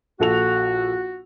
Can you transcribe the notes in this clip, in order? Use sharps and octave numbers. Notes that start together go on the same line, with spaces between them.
A#1 F#4 A4 F7